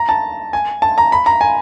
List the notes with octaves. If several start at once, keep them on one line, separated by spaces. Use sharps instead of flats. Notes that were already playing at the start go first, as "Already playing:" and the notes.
Already playing: A#5
A5
G#5
A5
A#5
B5
A#5
G#5